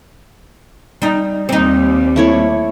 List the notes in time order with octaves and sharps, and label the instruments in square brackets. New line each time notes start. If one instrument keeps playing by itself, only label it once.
[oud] G3 D#4
[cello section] D#2 G3 [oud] C4 D#4
[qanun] A3 E4 C#5